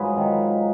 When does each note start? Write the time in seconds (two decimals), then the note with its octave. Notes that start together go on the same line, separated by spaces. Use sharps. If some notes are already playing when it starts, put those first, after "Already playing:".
Already playing: G#2 F#3 F4 G#4 B4
0.17 D#3